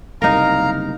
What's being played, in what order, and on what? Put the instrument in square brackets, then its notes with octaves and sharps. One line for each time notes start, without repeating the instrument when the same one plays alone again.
[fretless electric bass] F#1 C2 [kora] D#4 A#4 [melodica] F5 A#5